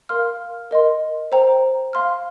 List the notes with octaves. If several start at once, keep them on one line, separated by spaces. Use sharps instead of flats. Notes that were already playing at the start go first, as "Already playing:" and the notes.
A#4 F5 C6 F6
A#4 D#5 C6
C5 G5 A#5
F5 C6 F6